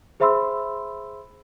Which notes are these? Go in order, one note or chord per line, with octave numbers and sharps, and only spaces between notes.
G#4 C5 E5 B5 C6 E6